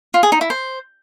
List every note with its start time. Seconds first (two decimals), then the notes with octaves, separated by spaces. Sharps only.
0.14 F4
0.23 G#4
0.32 D#4
0.41 E4
0.50 C5